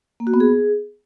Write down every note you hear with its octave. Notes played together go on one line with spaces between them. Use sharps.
A#3
F#4
B3
G#4